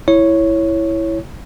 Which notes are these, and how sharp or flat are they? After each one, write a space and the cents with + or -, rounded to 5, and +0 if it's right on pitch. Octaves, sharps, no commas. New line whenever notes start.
E4 +0 C#5 +0